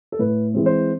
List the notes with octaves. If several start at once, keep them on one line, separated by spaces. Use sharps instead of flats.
A4
A2 B4
E3 G#3 C4
C5